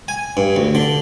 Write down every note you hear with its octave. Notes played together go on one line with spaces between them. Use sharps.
G#5
G2
D2
D3